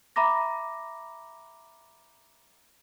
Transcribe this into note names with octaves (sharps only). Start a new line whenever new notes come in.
E5 A#5 B5 D6 A#6